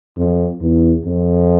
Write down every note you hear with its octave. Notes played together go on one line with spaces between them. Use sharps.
F2
E2
F2